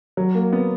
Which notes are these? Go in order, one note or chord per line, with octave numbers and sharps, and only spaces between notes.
F#3
A#3
B3